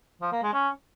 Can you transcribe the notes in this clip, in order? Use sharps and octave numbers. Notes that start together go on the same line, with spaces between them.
F3
A#3
G#3
C#4